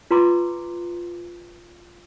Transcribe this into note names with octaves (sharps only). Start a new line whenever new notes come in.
F4 B4 A#5 C6 D6